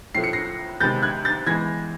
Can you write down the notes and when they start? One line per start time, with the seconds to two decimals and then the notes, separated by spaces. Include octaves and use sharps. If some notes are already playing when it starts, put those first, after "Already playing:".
0.15 A2 F3 A3 C7
0.24 C#7
0.33 A#6 C7
0.80 C3 D#3 G#3 B3 G6 A6
1.02 F#6 G#6
1.25 G6 A6
1.47 E3 G#3 B3 G#6 A#6